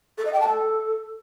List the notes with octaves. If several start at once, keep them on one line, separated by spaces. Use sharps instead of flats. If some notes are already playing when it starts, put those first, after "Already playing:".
A4
D#5
G5
A5
A4